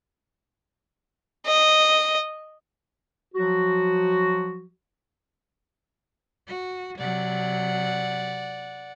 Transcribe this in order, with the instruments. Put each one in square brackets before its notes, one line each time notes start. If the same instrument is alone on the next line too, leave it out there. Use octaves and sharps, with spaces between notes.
[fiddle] D#5
[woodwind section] F3 F#3 F#4
[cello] F#4
[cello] C3 F#3 [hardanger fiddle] D5 F#5